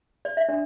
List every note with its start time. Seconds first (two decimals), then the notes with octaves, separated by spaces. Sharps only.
0.25 D5
0.37 E5
0.49 D4 D5